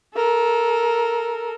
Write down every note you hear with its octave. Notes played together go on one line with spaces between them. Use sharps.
A4 A#4